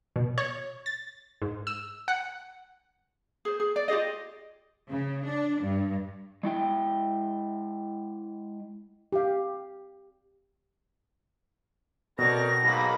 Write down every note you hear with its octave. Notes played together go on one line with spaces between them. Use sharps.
B2
C#5
A6
G#2
E6
F#5
G#4 C5
G#4
D5
F4 G4 G#4 D#5
C#3
D4
G2
G#3 E4 G5
G4 F5
B2 C4 A4 A#4 C#5 D5 A#6
B1 G#2 A#3 B5